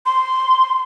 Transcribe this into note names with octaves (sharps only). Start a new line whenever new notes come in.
C6